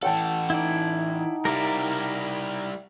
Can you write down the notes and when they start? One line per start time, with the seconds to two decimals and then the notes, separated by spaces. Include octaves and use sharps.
0.03 E3 A4 F#5 G5 A5
0.50 D#4 E4 D5
1.45 G3 E4 A#4 D5 F5